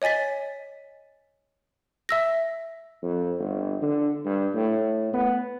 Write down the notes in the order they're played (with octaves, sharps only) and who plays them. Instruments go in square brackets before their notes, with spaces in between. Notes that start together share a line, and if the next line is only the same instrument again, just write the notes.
[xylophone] C#5 D#5 G#5 A6 B6
E5 E6 A#6
[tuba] F2
G1
D3
G2
A2
B3